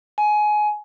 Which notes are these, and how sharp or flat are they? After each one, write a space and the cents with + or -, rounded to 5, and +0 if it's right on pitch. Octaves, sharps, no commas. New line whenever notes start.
G#5 +20